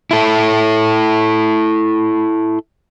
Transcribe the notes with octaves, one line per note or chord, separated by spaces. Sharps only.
E4 A4